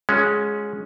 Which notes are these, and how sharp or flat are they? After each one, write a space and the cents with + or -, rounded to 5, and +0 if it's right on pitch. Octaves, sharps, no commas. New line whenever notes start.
G#3 +5 C#4 +0 F#4 -45